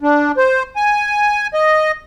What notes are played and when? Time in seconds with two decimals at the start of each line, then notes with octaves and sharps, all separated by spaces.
0.01 D4
0.37 C5
0.76 G#5
1.54 D#5